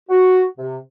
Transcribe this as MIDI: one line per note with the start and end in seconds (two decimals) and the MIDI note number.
0.10 0.45 66
0.58 0.77 48